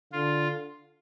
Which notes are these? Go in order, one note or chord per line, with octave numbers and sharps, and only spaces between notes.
D3 F4